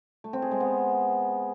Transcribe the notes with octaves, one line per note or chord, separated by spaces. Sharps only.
A3
C4
G#4
G#3
B3